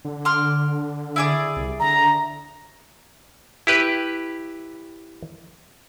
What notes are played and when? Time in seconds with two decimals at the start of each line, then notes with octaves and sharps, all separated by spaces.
0.05 D3
0.25 C6 D6 F6
1.16 E4 G#4 D5
1.56 C2
1.80 D3 A#5
3.67 E4 G4 B4